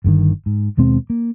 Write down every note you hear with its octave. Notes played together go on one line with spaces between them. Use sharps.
G1 G2 C3 D#3
G#2
D#2 B2 G#3 C4
A#3